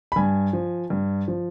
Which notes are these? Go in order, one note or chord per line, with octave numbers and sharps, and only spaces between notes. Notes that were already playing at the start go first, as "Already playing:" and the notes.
B5
G2 G#5
F3
G2
F3